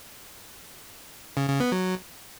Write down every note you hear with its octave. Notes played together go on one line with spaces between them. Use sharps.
C#3
C#3
B3
F#3